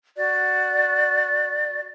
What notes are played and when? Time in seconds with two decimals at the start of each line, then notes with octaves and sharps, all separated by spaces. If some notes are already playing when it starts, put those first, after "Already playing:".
0.16 F#4 D5